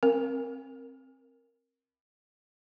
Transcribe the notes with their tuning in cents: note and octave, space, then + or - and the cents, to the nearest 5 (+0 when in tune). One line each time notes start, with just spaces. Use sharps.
C4 +20 A#4 +0